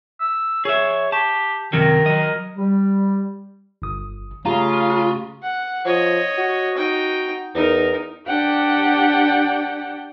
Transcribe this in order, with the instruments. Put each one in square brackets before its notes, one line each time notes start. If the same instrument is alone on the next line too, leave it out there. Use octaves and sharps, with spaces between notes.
[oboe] E6
[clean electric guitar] G#4 E5 [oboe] C#5
[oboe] G4 [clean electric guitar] A5
[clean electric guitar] F#2 C3 F#3 [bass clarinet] D#3 [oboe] A#4
[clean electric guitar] F#3 D#5
[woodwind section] G3
[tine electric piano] G1 D#6
[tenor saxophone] C#3 [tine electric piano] A3 G4 F5 [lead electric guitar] F4 [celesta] A#5
[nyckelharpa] F#5
[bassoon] F3 [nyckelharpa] C#5 D#5
[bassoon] F#4
[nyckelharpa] D#4 G5
[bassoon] E2 [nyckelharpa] D#4 A#4
[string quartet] D4 G4 F#5 G5